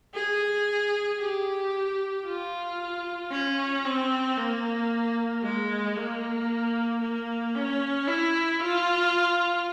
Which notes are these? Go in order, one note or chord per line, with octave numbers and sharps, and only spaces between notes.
G#4
G4
F4
C#4
C4
A#3
G#3
A#3
A#3
C#4
E4
F4